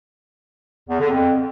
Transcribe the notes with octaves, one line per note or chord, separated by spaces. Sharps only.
E2
D3
F2